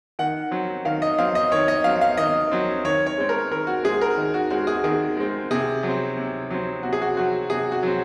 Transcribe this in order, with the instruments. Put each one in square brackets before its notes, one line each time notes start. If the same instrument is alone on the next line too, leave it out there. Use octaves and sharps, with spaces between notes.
[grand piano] D#3 F#5
F#3 C4
D#3 F5
D#5
F#3 C4 F5
D#5
D#3 C#5
D#5
F#3 C4 F5
F5
D#3 D#5
F#3 C4
D#3 C#5
C#5
G#3 C4
A#4
D#3 A#4
F#4
G#3 C4 G#4
A#4
D#3
F#4
G#3 C4 F#4
G#4
D#3 G#4
G#3 C4
C3 G#4
F#3
C4
C3
F#3 C4
C3 F#4
G#4
F#4
F#3 C4 F#4
C3 G#4
F#4
F#3 C4